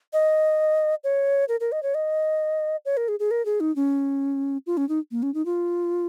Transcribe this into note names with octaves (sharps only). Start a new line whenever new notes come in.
D#5
C#5
A#4
A#4
D#5
C#5
D#5
C#5
A#4
G#4
G#4
A#4
G#4
D#4
C#4
F4
C#4
D#4
A#3
C#4
D#4
F4